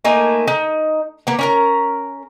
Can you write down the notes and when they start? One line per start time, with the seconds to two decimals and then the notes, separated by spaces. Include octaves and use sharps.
0.05 A3 A#3 D#4 G#5
0.48 D#4
1.27 A#3 B3
1.39 C#4 A#4 A#5